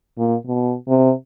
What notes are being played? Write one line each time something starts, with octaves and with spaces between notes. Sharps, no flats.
A#2
B2
C3